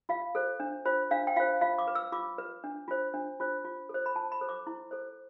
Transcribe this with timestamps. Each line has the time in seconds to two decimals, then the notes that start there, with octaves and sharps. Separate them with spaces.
0.09 F4 F5
0.35 A4 C5
0.60 D4
0.86 F4 C5
1.11 D4 F5
1.27 G5
1.36 F4 C5 F5
1.61 F4 F5
1.78 D6
1.88 B4
1.95 E6
2.12 F4 D6
2.38 B4
2.64 D4
2.88 F4 C5
3.14 D4
3.40 F4 C5
3.65 F4
3.89 A4 C5
4.06 B5
4.16 F4 A5
4.32 B5
4.41 A4 C5
4.49 D6
4.67 E4
4.91 A4 C5